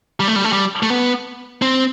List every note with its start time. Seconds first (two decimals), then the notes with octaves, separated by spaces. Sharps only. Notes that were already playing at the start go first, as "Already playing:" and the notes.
0.20 G3
0.28 A3
0.36 G3
0.44 A3
0.53 G3
0.83 A3
0.90 B3
1.62 C4